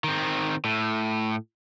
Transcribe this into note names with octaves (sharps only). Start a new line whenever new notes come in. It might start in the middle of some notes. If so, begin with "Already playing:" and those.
D#3 C4
A2